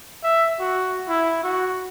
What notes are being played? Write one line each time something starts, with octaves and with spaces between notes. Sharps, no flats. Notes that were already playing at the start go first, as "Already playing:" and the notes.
E5
F#4
E4
F#4